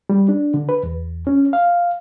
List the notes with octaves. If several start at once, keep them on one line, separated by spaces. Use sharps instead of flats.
G3
D4
D3
B4
E2
C#4
F5